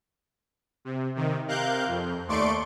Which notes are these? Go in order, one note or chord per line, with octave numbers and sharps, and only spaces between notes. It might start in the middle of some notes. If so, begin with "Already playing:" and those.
C3
C3 D#3
C3 A#4 F5 F#6 G6
F2
D#2 A3 D5 C6 C#6 D7